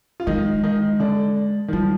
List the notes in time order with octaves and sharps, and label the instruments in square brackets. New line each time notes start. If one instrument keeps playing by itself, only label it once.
[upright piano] F4
[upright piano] D#3 D#4 [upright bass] G#3
[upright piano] D#3 D#4
D3 D4
D#3
[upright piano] F3 [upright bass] G3